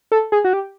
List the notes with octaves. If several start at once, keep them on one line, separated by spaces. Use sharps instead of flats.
A4
G#4
F#4
G4